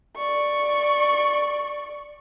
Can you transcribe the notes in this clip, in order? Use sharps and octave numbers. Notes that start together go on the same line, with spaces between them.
D5 C#6